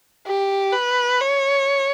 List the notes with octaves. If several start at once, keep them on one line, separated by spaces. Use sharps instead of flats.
G4
B4
C#5